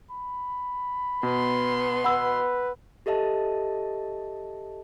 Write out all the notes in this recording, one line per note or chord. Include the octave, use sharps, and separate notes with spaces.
B5
B2 B3 C6
B4 F#5 B5 E6
G4 A4 D#5 E5 A5